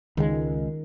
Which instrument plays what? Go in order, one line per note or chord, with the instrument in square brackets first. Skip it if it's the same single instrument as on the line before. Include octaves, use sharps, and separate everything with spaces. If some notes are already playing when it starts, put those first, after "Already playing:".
[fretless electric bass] C#2 G#3 [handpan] D#3